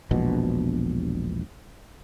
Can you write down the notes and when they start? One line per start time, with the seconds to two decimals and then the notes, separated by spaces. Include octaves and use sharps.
0.11 E1 A#1 B2